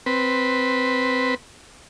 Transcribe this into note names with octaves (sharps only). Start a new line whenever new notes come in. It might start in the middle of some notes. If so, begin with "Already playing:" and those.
C4 B4